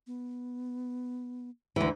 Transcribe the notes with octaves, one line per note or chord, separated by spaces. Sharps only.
B3
D2 E3 D4